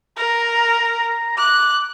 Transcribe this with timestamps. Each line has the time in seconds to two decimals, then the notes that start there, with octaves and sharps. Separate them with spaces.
0.17 A#4 A#5
1.38 D6 F#6